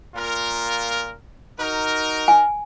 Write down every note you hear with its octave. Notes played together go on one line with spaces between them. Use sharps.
A#2 F4 A#4
D#4 F#4 A#4
G#5